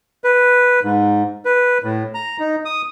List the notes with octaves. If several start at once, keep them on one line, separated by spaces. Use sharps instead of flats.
B4
G#2
B4
A2
A#5
D#4
D#6